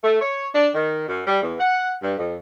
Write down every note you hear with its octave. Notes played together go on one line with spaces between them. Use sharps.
A3
C#5
D4
D#3
F#2
G3
E2
F#5
G2
F2